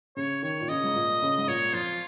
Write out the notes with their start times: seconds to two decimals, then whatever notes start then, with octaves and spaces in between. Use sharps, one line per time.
0.16 C#3 C#5
0.42 D#3 C#5
0.60 A#2
0.68 C#3 D#5
0.84 G#2
0.95 A#2
1.22 C#3
1.38 G#2
1.48 A#2 C#5
1.73 F2 F4